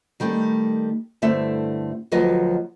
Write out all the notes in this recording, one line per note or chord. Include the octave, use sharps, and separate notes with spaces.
D#3 G3 A3 C#4 D#4
G2 D3 A3 C4 E4 E5
D2 F3 F#3 B4 D#5